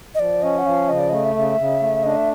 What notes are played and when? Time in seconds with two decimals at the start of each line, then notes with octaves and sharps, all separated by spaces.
0.15 D#5
0.19 F3 D5
0.42 C#4 D#5
0.58 F#5
0.65 F3 F5
0.89 C#3 D#5
0.99 D5
1.09 A3 D#5
1.24 E5
1.35 C#3
1.59 C#3
1.81 A3
2.03 D4 D#5
2.16 E5